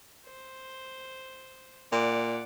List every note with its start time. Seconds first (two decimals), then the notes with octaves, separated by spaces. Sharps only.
0.26 C5
1.92 A#2 D5 F#5